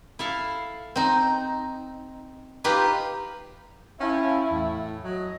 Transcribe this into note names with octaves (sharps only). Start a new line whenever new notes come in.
E4 A4 F5
C4 D#4
D#4 F4 G4 B4
C#4 E4 F5 G5 A5
E2 A2
F#3 D#5